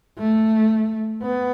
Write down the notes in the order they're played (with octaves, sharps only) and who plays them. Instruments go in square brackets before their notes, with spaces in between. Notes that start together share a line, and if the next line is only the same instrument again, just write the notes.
[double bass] A3
B3